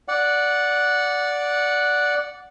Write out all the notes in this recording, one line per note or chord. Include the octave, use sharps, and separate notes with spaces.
D5 F#5